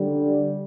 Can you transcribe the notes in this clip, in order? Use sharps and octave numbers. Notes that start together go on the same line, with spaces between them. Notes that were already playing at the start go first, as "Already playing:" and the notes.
Already playing: D3 G3